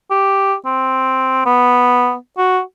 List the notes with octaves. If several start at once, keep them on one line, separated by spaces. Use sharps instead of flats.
G4
C4
B3
F#4